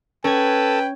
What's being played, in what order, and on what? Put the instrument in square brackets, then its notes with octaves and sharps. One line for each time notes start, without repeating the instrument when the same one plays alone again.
[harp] C#4 G#6 [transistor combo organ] A4 [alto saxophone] B4 [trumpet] G5